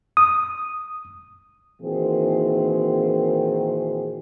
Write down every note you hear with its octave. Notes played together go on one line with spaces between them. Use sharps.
D#6
A#2 D#3 E3 C4 F#4 G#4